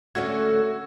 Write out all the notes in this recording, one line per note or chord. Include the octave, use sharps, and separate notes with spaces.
D3 A3 C#4 F#4 G#6